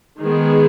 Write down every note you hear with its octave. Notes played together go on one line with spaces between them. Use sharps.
D#3 G#3 B3 G#4